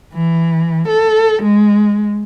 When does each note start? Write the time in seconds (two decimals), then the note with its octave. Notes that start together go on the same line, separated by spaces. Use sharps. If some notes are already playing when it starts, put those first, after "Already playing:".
0.13 E3
0.88 A4
1.43 G#3